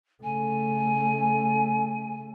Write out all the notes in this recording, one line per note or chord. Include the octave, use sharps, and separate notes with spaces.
C#3 A3 G#5